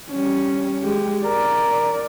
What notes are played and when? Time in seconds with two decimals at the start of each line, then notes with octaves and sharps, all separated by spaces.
0.11 G3 C#4
0.82 G#3 G4
1.25 A#4 D5